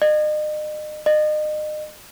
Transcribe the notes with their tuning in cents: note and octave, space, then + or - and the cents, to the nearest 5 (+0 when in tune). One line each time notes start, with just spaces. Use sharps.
D#5 -40
D#5 -35